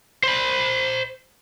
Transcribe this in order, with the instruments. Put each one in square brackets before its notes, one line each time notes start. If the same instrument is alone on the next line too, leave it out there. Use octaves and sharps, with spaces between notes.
[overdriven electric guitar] C5 B5